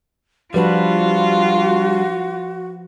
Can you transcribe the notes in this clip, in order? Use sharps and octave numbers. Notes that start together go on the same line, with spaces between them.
F3 G3 D4 F4 F#4 B4